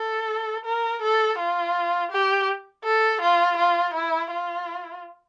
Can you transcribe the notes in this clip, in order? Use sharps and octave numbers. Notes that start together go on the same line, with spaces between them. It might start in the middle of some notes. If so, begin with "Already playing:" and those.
Already playing: A4
A#4
A4
F4
G4
A4
F4
F4
E4
F4